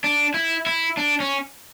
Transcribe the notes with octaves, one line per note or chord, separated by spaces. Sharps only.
D4
E4
E4
D4
C#4